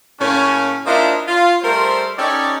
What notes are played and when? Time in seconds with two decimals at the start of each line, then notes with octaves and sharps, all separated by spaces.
0.20 A2 C#3 A#3 C#4
0.85 A#3 D4 E4 F4 C5 D#5
1.27 F4
1.62 G3 A3 A#4 C5
2.17 C#4 D#4 G4 A4 C#5 D5